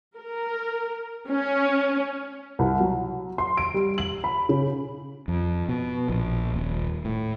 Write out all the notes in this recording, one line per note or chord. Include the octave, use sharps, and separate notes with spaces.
A#4
C#4
C2
F#3
C6
D7
G3
F#7
B5
C#3
F2
B2
A#1
D#1
A2